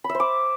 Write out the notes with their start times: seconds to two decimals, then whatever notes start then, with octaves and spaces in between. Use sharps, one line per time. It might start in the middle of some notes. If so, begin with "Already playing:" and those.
0.04 B5
0.09 E5
0.15 C5
0.20 D6